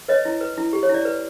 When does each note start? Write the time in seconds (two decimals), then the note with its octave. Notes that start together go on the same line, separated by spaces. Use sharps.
0.08 B4 C#5 D#5
0.25 E4
0.41 B4
0.57 E4
0.73 G4
0.83 C#5
0.90 E4 D5
1.05 B4